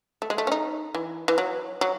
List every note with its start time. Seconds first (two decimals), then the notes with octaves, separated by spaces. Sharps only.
0.22 A3
0.30 G#3
0.38 A3
0.47 C#4
0.52 D#4
0.95 E3
1.28 E3
1.38 F#3
1.81 F#3